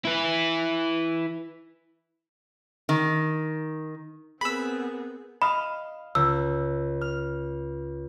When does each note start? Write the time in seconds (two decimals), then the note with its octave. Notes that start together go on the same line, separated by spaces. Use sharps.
0.05 E4 B4
2.89 D#3
4.41 B3 C4 G#4 A#4 B5 E6
5.42 D#5 F5 B5
6.15 C#2 E6
7.01 F6